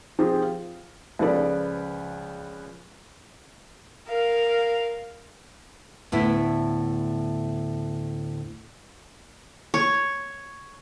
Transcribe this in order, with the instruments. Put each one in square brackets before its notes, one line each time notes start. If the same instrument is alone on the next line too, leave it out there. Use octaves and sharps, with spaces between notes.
[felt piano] F3 C4 F4 G4 G#4
F5
C#2 C#3 F3 A4 B4 D5
[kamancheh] A#4 F5
[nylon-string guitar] D2 A2 B3 E4
[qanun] C#5